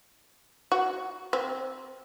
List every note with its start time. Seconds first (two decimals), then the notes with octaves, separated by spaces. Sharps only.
0.72 F#4
1.33 C4